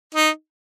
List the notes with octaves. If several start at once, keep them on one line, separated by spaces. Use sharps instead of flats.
D#4